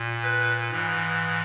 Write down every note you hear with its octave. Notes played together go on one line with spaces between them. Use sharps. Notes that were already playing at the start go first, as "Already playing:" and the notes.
Already playing: A#2
B4
G#2 E3